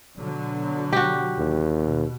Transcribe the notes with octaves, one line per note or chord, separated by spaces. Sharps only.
B2 D3 F#3
F#4 G4
D#2
B2